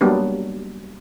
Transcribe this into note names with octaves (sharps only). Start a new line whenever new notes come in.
F#3 G3 A#3 B3 D4